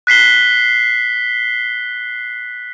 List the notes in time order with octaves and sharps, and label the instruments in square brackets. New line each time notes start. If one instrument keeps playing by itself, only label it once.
[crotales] F#6 B6 C7 G7